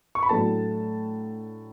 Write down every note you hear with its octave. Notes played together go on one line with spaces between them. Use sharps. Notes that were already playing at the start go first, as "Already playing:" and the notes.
C#6
B5
A2 F#3 A3 D4 A5